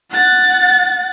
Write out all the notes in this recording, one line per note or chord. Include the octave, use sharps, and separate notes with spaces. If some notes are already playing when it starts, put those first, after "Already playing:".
F#5 A6